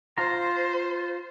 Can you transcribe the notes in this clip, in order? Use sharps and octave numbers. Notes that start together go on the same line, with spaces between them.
F4 C5 A#5